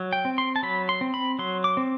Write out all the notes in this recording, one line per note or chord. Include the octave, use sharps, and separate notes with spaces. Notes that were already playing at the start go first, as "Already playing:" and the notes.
Already playing: F#3
G5
C4
C6
A5
F#3 B5
C6
C4
B5
F#3 C6
D6
C4